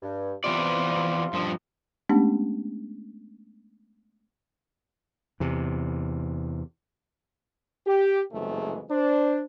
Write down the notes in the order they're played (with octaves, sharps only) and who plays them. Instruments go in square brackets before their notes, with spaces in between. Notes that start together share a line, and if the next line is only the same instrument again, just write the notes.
[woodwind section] G2
[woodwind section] C3 F4 C6 [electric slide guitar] E3 B3 D5
[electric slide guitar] G2 F3
[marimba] G#3 A3 B3 C#4 D4 G4
[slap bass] E2 C3
[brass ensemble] G4
F#1 C2 F2 E3 G#3 A3
D4 C5